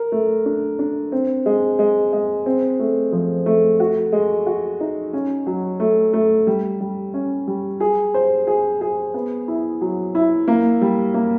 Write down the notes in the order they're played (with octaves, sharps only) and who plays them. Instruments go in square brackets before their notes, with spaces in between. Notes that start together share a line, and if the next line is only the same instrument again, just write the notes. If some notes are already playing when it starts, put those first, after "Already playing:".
Already playing: [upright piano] A#4
A3
D4
D4
C4
G#3
G#3
G#3
C4
A3
F3
A3
F#4
G#3
F#4
D#4
C#4
F#3
A3
A3
G3
G3
C#4
G3
G#4
C5
G#4
G#4
B3
E4
F#3
E4
A#3
G3
A#3